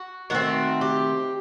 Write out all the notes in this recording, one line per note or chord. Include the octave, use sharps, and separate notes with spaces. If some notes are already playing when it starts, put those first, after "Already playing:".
Already playing: F#4
D#3 A3 C4 F#4
G4